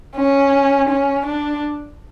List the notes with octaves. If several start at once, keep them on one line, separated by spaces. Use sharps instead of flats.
C#4
C#4
D4